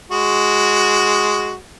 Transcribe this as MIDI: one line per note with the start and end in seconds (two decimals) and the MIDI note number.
0.11 1.53 56
0.11 1.53 66